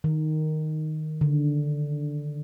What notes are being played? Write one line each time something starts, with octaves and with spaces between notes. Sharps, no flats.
D#3
D3